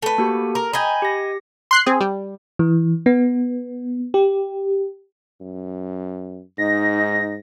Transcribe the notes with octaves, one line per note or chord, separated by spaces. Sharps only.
A3 B4
A#3 F#4 G4
A#4 A#5
D#5 G5 G#5 B5
G4 A#6
C6 F#6 C7
C4 G#4
G3
E3
B3
G4
F#2
G#2 D#4 A#6